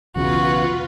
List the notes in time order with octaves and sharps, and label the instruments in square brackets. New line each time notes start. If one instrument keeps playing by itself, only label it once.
[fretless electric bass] B1 E2 C#3 [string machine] F4 B4 [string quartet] F#4